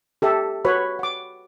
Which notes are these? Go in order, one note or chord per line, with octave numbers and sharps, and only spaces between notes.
G4 A4 E5
F#4 B4 C#5 B5
F#5 D6